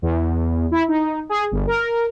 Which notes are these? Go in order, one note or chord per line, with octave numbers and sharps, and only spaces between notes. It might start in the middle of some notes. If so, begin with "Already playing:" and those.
E2
E4
D#4
G#4
G1
A#4